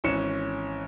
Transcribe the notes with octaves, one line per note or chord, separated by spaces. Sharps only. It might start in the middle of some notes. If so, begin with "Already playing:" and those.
G#1 E3 C#4 C#7 E7